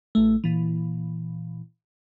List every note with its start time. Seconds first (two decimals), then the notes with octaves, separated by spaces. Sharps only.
0.15 A1 A3
0.44 A#2 E3